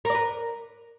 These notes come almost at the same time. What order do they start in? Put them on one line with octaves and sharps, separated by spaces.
A#4 D5 B4